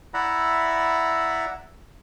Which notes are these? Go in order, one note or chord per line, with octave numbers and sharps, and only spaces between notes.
E4 D5 E5 F#5 A#5 B5